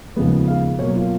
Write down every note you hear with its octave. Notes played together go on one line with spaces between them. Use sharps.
D#2 C#3 F3 G#3 B3
F5
B2 F#3 A#3 C#5
F4